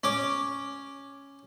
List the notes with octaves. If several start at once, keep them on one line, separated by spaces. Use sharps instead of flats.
C#4 D6